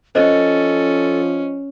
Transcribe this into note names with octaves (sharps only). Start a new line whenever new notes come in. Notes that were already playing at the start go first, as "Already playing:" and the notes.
F3 C#4 A4 C5 D#5